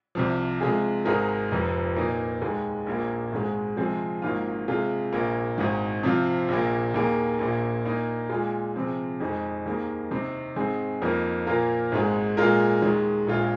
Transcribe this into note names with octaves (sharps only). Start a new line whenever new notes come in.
C2 C3 F3
C3 G#3 F4 G#4
G#1 G#2 G#3 D#4 A#4
F1 F2 F3
A#2 A#3 D#4
D#2 D#3 G#3
A#1 A#2 A#3
G#1 G#2 D#3 G#3
C3 F3 G#3 C4 G#4
G#1 G#2 D#3 A#3 F4
C3 G#3 F4 G#4
A#1 A#2 A#3
G#1 G#2 D#3
C3 F3 C4 F4
A#1 A#2 A#3
D#2 D#3 A#3 G#4
A#1 A#2 A#3
A#2 A#3 D#4
A#2 G#3 F4
C3 F3 C4 G#4
F2 D#3 G#3 D#4 G#4
D#2 D#3 A#3 G#4
C3 D#3 C4
G#2 D#3 C4 G#4
F2 F3 A#3 D#4 A#4
A#2 A#3 F4 A#4
G#1 G#2 G#3
A#2 G#3 F4 A#4
D#2 D#3 G#3
A#1 A#2 G#3 F4